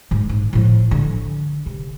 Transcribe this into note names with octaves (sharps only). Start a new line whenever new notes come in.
G#2 G#3
G#2
A2 F3
D3
C3